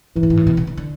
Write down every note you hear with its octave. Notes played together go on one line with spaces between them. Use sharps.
A#2 E3
A2
G#2
A2
B2
C3
D3
D3